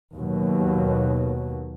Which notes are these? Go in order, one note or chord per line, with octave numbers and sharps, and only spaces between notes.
D#2 B2 F#3